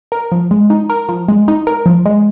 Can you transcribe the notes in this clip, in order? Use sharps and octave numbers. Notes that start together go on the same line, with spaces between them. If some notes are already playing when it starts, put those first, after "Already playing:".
A#4
F3
G#3
D#4
A#4
F3
G#3
D#4
A#4
F3
G#3